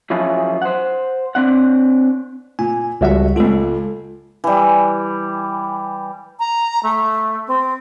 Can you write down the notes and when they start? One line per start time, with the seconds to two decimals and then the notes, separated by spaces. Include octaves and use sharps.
0.10 F3 F#3 C#4 E4 F4 G#4
0.62 C5 F#5
1.35 C4 D4 F#5
2.59 A#2 G#5
3.01 C#2 F3 G3 F#4 E5 F#5
3.36 C#2 A#2 F4 A4
4.44 E3 G3
6.39 A#5
6.83 A3
7.47 C4